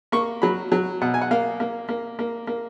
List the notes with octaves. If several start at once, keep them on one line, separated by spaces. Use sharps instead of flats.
A#3 C#6
F#3 B5
F#3
B2 F#5
G#5
F#5
A#3 F5
A#3
A#3
A#3
A#3